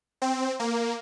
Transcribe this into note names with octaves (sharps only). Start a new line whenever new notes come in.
C4
A#3